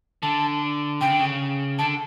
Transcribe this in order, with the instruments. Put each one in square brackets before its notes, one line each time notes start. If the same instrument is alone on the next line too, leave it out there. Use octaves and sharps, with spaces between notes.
[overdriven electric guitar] D3 [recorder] A5
[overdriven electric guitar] C#3 [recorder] G5
[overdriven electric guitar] D3
C#3
[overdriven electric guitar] D3 [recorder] A5